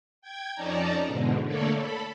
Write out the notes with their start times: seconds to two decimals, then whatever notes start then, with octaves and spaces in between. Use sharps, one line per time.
0.21 G5 G#6
0.55 F2 C#4 D#4 D5 A5 A#5
1.06 E2 G#2 B2 D3
1.45 D3 A3 A#3 A4 C#5 D5
1.77 A4 B5